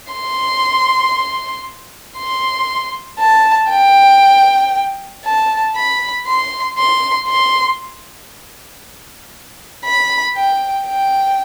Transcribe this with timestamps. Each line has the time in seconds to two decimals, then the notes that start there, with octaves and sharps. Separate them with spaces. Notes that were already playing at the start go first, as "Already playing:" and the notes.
0.12 C6
2.17 C6
3.19 A5
3.71 G5
5.25 A5
5.76 B5
6.27 C6
6.78 C6
7.29 C6
9.85 B5
10.36 G5
10.87 G5